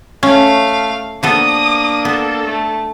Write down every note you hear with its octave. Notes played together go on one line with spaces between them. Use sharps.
A3 C#4 F5
F3 A#3 B3 D4 A4 D#6
B3 A4
A3